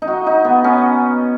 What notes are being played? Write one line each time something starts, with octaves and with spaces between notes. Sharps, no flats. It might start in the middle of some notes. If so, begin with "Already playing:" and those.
D#4
F#4
D#4
B3
C#4